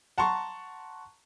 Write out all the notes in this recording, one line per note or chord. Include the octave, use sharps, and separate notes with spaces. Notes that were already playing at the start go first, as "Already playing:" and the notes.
F#5 A5 A#5 C6 C#6